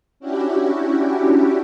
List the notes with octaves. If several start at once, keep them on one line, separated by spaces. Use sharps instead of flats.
C#4 D4 E4 F#4 G4